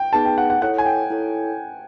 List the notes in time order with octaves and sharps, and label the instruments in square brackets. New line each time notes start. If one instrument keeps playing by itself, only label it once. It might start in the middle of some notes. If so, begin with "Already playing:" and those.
Already playing: [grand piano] G5
[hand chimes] B3 D#4 G#4 B4 [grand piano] A5
[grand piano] G5
F#5
F#5
[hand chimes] E4 A4 C#5 [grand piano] F#5
[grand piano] G#5
G5
[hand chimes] E4 A4 C#5